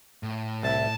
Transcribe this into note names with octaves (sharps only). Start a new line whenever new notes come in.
A2
C2 E5 A5